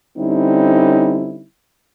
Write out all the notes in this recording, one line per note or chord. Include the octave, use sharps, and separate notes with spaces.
D3 G3 C4 C#4 D#4 E4